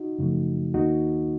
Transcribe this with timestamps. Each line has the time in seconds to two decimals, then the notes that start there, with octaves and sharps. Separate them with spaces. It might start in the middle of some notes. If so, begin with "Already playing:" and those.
Already playing: D#4 F#4
0.19 F#2 C#3 F3 A3
0.74 D#2 D#3 A#3 D#4 F#4